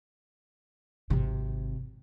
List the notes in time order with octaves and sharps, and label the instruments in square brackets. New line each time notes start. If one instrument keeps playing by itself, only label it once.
[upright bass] G#1 C3